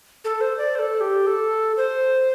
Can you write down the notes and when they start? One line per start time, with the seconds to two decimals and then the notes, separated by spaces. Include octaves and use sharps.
0.25 A4
0.41 C5
0.58 D5
0.75 C5
0.79 A4
1.01 G4
1.27 A4
1.77 C5